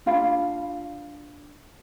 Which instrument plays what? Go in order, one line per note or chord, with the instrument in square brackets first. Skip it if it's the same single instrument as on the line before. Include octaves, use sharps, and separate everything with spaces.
[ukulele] D4 F4 F5 B5